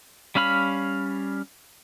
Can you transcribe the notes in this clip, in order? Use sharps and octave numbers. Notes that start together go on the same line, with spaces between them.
G3 C#4 F5 B5 F6